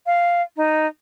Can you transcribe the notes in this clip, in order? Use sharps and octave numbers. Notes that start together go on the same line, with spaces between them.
F5
D#4